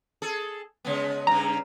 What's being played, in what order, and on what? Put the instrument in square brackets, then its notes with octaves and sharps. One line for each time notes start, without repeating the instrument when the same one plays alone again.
[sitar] G#4 A4
C#3 G#3 B3
[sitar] G2 C#3 [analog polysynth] A#5